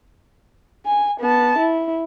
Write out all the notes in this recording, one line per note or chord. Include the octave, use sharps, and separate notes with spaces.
G#5
B3 A5
E4